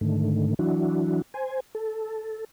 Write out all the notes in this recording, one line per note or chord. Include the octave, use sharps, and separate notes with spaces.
G#2 D3 D#3 A3
E3 F#3 D4 E4 F#4
C5 G#5
A4